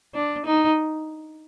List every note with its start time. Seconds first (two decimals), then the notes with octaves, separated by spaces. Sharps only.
0.15 D4
0.46 D#4